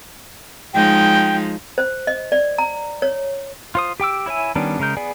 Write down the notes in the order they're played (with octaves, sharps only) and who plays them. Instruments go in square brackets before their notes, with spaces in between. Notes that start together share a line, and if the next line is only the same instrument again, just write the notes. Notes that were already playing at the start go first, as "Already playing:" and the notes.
[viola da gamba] F3 G#3 D#4 [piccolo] G5
[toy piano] C5
D#5
D5
A#5
C#5
[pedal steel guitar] F4 C5 D#6
G4 G5 D6 E6
E4 C#5 E5 G#5
D#3 G3 B3 C#4 D4
C#3 G#3 A#4 G6
B3 G#4 D5 G#5